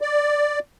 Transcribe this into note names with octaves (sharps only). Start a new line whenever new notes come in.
D5